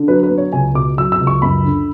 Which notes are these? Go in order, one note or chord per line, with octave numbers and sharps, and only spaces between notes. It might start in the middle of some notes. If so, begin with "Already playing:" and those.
Already playing: D3
F#3 B4
B4
B3
C#5
C#2 G#5
B2 D6
F#3 E6
E6
C#2
C#6
F#2 B5
D3